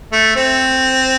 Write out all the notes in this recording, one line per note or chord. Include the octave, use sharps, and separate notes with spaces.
A3
C4